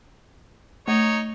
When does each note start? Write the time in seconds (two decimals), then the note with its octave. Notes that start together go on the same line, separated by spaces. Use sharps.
0.88 A3 D#4 C#5